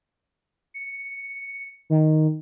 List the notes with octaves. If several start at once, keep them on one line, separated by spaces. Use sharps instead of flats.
C#7
D#3